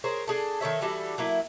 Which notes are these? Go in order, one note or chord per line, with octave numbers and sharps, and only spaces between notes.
G#4 A#4 C5 C#5
D4 G#4 A4
D#3 A4 C#5 E5
E3 G3 F#4 A4
F#3 A#3 E4